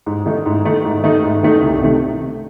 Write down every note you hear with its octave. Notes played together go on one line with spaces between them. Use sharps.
G#2
D#3 A3 D#4
G#2
D#3 A3 D#4
G#2
D#3 A3 D#4
G#2
D#3 A3 D#4
C2
C3 D#3 A3